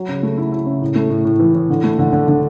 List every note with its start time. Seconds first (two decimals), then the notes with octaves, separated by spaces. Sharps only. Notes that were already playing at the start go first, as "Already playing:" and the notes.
Already playing: F#3
0.09 C#3
0.23 A3
0.38 E4
0.52 E4
0.66 C#3
0.82 A2
0.96 A3
1.10 A2
1.25 A2
1.39 E3
1.55 A2
1.70 D3
1.84 A3
1.99 D3
2.13 D3
2.28 D3